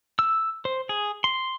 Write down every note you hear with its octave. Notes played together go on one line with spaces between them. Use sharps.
E6
C5
G#4
C6